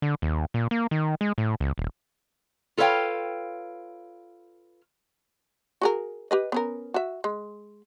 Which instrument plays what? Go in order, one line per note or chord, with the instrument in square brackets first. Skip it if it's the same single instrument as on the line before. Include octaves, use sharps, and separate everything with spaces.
[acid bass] D3
D#2
A#2
A#3
D#3
G#3
A2
C#2
D#1
[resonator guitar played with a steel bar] F4 A4 B4 C#5 F5 G5
[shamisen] F#4 G#4 A#4
G4 B4 D#5
B3 C#4 A#4
F#4 E5
G#3